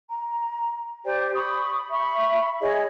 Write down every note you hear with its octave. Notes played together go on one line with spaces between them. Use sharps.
A#5
G4 C5 D5 G5
B5 C#6 D#6
E5 B5 C#6
E4 G#4 C#5 D#5